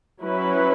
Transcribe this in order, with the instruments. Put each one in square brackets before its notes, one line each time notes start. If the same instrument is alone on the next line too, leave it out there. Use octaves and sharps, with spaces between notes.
[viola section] F#3 C#4 E4 B4